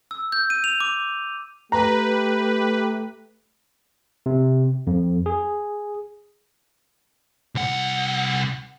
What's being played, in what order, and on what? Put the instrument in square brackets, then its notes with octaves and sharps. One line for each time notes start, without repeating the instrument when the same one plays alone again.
[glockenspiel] E6
G6
D#7
F7
D6
[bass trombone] A3 [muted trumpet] G4 [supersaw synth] B4 [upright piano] A#5
[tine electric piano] C3
F2
G#4
[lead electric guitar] C2 F#5